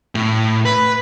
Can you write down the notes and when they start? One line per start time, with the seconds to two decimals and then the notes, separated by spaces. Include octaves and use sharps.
0.15 A2
0.65 B4